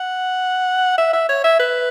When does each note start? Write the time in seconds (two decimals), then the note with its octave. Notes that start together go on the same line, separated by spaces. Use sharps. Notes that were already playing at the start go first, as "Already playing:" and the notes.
Already playing: F#5
0.98 E5
1.13 E5
1.29 C#5
1.44 E5
1.60 B4